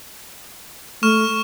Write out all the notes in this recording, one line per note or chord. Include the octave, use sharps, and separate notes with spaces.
A3 C#6 F6 E7